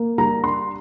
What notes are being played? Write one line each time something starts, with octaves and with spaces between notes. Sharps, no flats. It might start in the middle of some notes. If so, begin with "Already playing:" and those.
Already playing: A#3
G3 A#5
D4 C6